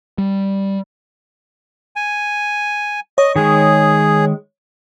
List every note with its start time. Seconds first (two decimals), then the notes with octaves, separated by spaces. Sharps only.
0.18 G3
1.96 G#5
3.18 C#5 D#5
3.36 D#3 G#3 G#4